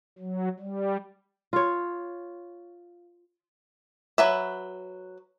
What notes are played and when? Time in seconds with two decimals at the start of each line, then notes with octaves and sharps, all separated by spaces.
0.18 F#3
0.59 G3
1.53 F4 C#5
4.18 F#3 B4 E5